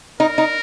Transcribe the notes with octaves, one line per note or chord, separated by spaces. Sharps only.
D#4 A#4
D#4